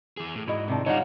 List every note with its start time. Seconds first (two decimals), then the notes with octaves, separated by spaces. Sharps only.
0.17 E3 G#4
0.35 A2
0.47 G#2 E4 F#4 D#5
0.68 C3 D#3 D4
0.86 D3 G3 D#4 F4 C#5 F5 F#5